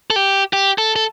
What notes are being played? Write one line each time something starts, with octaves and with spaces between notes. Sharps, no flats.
A4
G4
G4
A4
A4